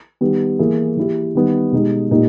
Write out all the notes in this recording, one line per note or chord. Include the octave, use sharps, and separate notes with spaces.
D#3 G3 B3 G4
E3 A#3 E4 G#4
E3 A#3 E4 G4
D#3 G3 B3
B2 G#3 D#4 G4
A#2 A#3 D#4 G4